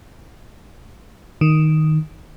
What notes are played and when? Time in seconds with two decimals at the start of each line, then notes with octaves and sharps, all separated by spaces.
1.41 D#3